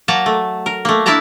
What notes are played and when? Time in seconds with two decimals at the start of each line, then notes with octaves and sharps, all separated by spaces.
0.08 F#3 A#3 A5 A#5
0.26 A3
0.66 A#4
0.85 A3 A#3
1.06 D4 E4 A#4 D5 A5 A#5